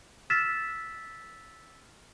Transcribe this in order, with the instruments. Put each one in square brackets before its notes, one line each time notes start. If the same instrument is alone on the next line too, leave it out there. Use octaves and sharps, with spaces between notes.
[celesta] E6 F6 A6 B6 E7